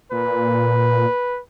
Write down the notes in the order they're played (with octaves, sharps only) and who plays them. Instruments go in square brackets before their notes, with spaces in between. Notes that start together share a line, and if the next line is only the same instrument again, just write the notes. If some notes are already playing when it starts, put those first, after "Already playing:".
[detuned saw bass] A#2 [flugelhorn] B4